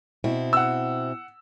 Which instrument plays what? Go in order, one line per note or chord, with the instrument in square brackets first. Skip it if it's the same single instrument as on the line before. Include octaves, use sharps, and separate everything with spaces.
[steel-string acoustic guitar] B2 C4 E4
[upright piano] F#5 E6